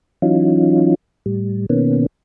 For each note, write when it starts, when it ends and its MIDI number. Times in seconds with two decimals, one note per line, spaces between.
0.22 0.95 52
0.22 0.95 54
0.22 0.95 61
0.22 0.95 63
0.22 0.95 65
1.26 1.66 45
1.26 1.66 55
1.70 2.06 47
1.70 2.06 51
1.70 2.06 58
1.70 2.06 59
1.70 2.06 61